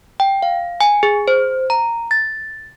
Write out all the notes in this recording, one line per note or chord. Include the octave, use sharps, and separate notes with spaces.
G5
F5
G#5
G#4
C5
A#5
A6